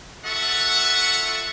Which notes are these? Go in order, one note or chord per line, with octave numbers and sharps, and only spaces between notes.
F4 A4 E5 F#5 C#6